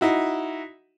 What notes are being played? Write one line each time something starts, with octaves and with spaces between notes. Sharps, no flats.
D#4 E4 F#4